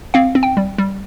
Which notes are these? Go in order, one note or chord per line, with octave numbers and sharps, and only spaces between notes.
C4 F5
C4
G5
G3
G3